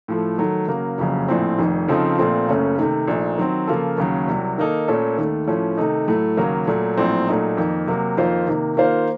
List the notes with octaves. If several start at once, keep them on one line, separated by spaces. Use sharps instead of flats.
A2 F3 A3
D#3 F#3 A3
C#3 F#3 A#3
F#1 F2 C#3 F#3
A#1 A2 F3 C4
F1 F2 D#3
C#3 F3 C4 D#4 A4
A#1 A#2 A3 C4 F4
F#1 F#2 C#3 A3 C#4
C3 D#3 A3
A#1 A#2 A3 D#4
D#3 F#3 C4
C#3 F3 A#3 F4 A4
D#2 C#3 F#3
C2 C3 F#3
D#3 A#3 D#4 A4
A#2 A3 C#4 A4
D#2 D#3 A3
A2 F3 A3 C#4
C3 D#3 A3 D#4
A2 F#3 A3
D#2 C#3 F#3 A#3 C#4
A#2 F#3 A3
A#1 A2 F#3 C4
A#2 F#3 A3 D#4
F2 D#3 A#3
C3 F#3 A#3
F2 D#3 A#3 F4 C5
C3 D#3 A#3
D#3 A#3 F4 C5 F5